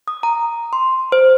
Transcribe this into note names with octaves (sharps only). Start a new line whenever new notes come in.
D#6
A#5
C6
C5